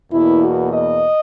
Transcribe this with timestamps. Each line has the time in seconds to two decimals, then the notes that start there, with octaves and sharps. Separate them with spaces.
0.12 E2 B2 A#3 E4
0.43 F#4
0.72 D#5